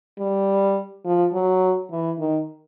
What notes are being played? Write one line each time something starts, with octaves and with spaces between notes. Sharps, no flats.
G3
F3
F#3
E3
D#3